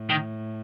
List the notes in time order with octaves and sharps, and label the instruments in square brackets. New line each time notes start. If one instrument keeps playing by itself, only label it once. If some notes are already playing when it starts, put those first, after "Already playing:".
Already playing: [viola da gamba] A2
[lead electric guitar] D#3